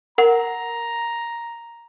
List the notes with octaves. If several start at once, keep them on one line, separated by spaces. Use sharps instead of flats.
A#4 F#5 A#5